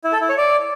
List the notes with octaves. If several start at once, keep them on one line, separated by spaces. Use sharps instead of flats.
E4
A4
E4
C#5
D5